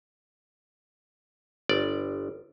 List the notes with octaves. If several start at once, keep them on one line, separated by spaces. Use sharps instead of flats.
G1 D5